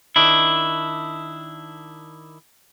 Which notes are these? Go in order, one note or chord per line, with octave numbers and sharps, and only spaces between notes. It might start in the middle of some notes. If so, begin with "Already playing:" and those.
D#3 D4 E4